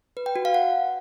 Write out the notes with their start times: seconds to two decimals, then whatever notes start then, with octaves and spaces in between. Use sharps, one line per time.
0.17 B4
0.26 G5
0.36 F#4
0.45 F5
0.54 F#5